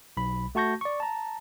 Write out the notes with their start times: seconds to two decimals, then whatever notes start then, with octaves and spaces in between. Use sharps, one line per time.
0.17 B1 B5
0.55 A3 F#4 A5 C#6 G6 A#6
0.81 D5 C#6
1.00 A5 A#5